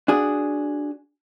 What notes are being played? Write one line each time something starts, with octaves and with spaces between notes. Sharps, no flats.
D4 F#4 G#4